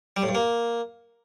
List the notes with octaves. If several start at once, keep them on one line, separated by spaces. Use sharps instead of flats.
G3
A2
G2
A#3